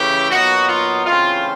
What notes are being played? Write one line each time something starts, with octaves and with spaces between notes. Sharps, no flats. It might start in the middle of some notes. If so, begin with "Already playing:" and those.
Already playing: C#3 E3 A3 G4
A#2 F#3 B3 D#4 F#4
F4
C#3 E3 A3 C4 F4